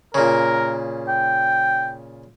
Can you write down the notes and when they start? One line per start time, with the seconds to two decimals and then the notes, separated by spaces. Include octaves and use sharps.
0.14 A#2 C#3 A#4
1.08 G5